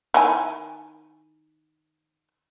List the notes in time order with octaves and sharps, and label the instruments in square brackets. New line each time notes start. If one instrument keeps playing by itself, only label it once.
[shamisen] D#3 E4 G#5